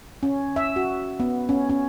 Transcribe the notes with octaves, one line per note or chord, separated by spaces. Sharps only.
C#4
E5
F#4
B3
C#4
C#4